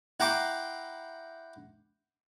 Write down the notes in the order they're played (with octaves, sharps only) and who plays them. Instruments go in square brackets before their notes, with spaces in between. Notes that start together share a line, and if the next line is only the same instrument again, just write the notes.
[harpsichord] E4 F#5 G5 A#5 C6 D6